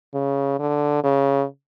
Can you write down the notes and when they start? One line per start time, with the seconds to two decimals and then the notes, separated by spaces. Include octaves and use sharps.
0.14 C#3
0.59 D3
1.04 C#3